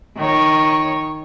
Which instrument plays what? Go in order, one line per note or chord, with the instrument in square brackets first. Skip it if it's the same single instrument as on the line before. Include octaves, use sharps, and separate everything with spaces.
[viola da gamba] D#3 C#5